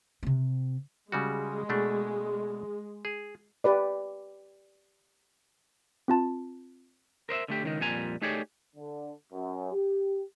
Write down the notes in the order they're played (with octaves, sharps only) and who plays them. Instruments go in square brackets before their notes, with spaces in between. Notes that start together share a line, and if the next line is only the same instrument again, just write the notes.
[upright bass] C3 C4
[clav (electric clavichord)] C#3 G3 F#4 [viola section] G#3
[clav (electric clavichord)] B2 A3 D4
G#4
[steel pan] G4 B4 D5
[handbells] C4 F4 A5
[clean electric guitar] A#4 C5 D#5 E5
D3 A3 G4
C#2 D#3 D#4
F2 A#2 G3 G#5 A#5
A3 D#4 G4 G#4 C#5 D5
[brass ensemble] D3
F#2
G4